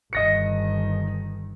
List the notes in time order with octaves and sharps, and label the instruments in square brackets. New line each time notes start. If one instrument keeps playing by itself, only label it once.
[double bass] G1 D#3 [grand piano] D#5 A#6 C#7